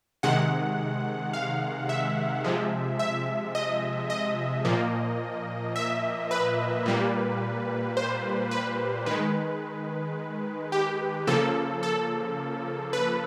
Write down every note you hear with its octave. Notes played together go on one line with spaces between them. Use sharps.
C3 D#3 G#3 F#5
F5
E5
C3 F3 G#3
E5
D#5
D#5
A#2 F3 A#3
E5
B4
A#2 G3 A#3
C5
B4
D#3 G#3 B4
G4
C#3 F3 A#3 A4
A4
B4